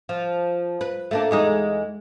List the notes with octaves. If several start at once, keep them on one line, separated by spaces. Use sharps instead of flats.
F3
B4
A3 A#3 D4
E2 G#3 D#4